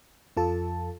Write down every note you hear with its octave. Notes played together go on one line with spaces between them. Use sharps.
F2 F3 F4 A4 A5